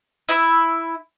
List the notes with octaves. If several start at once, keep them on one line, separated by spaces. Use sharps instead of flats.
E4 E5 B5